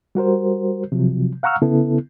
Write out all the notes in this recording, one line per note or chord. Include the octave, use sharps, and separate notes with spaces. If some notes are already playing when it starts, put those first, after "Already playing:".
G3 F#4 A#4 C5
C3 F3 F#3
F5 F#5 A#5 C#6 E6 F6
C#3 B3 E4 A4